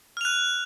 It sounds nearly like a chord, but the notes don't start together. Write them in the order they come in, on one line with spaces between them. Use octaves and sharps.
F6 F7 F#6